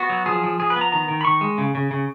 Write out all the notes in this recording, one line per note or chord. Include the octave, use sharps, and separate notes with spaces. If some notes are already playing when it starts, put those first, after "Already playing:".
Already playing: B3 F#4
F#3
F3 G#4
F3
F3 G#4
B4
B3
A#5
D#3 A#5
D#3
B5
D#3 C#6
G#3
C#3
C#3
C#3